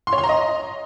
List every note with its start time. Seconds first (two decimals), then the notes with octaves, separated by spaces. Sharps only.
0.07 C6
0.13 C#5
0.18 C6
0.24 A#5
0.29 D#5